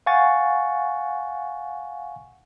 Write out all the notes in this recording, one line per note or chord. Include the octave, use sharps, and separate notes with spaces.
F5 F#5 G#5 C#6 A6